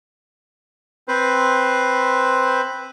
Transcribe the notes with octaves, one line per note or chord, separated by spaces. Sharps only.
C4 B4 C5